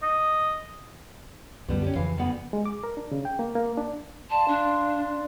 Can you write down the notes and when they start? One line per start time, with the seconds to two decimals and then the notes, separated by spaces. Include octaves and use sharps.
0.02 D#5
1.68 C#2 F#2 D3 G3 B3
1.82 C#4 G4
1.96 F2 C#3 E3 F5
2.18 D2 B3
2.53 G#3
2.66 D6
2.84 A#4
2.97 D4
3.12 C#3
3.25 G5
3.39 A#3
3.55 A#3
3.77 D4
4.30 D5 F5 A5 C6
4.48 D4